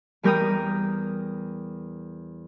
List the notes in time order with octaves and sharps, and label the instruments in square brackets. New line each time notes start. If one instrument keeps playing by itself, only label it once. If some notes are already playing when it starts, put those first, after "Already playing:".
[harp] E2 G3 A#4 G5 A#5 D#6